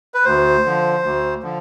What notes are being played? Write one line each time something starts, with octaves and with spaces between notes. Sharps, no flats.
B4
D2 C5
D3 F3
D2
D3 F3